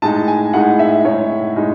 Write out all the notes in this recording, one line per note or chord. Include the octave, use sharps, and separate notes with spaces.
A2 G#3 D#4 A5
G#5
A2 G#3 D#4 F#5
E5
A2 G#3 D#4 C#5
A2 G#3 D#4